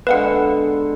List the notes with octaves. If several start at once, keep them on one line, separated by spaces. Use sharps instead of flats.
D3 G#3 B3 B4 F5 F#5